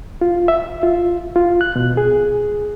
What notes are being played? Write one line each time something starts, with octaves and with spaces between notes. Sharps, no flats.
F4
E5
F4
F4
F#6
B2
G#4